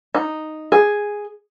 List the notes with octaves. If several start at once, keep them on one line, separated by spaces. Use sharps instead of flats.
D#4
G#4